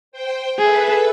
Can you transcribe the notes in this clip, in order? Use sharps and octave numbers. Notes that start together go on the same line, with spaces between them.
C5 G5
G#4 A4 B4 E5